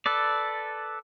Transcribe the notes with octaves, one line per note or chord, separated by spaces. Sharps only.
A4 B4 D5